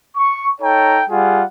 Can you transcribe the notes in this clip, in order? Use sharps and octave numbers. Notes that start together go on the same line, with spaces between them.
C#6
D#4 A4 C#5 G5 A#5
G3 F4 G#4 F#5